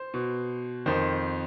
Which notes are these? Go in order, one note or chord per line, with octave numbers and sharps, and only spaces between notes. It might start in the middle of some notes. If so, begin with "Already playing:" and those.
Already playing: C5
B2
F2 D#3 C5